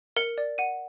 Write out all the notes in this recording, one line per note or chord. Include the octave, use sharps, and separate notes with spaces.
A#4 C#7
D5
F#5 D#7